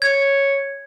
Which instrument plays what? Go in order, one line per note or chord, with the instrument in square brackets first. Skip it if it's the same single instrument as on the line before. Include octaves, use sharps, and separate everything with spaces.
[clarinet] C#5 [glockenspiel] G#6